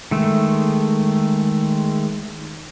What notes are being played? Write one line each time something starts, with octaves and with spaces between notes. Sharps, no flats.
D#3 G#3 A3